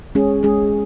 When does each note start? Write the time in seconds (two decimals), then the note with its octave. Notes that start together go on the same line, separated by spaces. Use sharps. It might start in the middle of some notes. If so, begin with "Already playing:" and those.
0.15 G#3 C#4 G#4
0.43 G#3 C#4 G#4